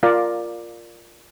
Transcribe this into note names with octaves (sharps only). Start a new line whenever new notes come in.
F4 A#4 D5 F5